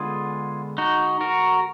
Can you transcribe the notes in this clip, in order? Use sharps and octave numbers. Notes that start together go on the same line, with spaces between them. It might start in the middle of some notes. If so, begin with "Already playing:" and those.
Already playing: D3 G#3 B3 F4 G#4
D#4 F#4
F#4 A#4